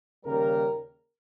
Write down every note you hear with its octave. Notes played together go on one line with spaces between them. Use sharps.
D#2 C#3 G3 A#4